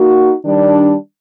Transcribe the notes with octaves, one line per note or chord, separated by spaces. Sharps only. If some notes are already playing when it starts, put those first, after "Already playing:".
Already playing: A#3 D#4 F#4
D#3 G3 D4